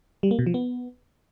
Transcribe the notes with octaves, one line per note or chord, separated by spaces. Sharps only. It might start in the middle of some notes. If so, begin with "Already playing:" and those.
G3
A#3
B2
F3
B3